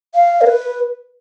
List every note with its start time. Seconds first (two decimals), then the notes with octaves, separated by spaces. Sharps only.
0.15 F5
0.41 A#4
0.47 B4